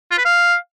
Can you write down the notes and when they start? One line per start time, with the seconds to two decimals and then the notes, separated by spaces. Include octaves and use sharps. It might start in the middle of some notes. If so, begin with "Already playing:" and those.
0.11 F4
0.18 B4
0.25 F5